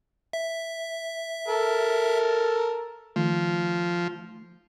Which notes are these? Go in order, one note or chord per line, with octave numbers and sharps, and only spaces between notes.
E5
A4 A#4
D#3 F3 A3